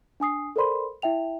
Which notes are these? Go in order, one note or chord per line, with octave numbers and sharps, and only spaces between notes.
D4 G#5 D#6 C7
A4 A#4 C5 D5 B5 C6
E4 E5 G5 F7